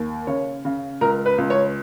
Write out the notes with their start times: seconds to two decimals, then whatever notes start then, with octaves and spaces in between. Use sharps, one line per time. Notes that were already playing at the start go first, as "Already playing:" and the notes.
Already playing: D#2
0.27 C#3 C#5
0.65 C#3
1.01 C#2 A#4
1.26 B4
1.38 C#2
1.50 C#5